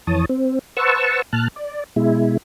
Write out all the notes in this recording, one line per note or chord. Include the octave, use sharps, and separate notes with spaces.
F2 E3 C#5 A5 D#6
C4
B4 C5 F#5 A5 C#6 E6
A#2 A5 F6 F#6
D5
B2 G#3 E4